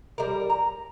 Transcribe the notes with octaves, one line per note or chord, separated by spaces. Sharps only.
G3 A#4
A#5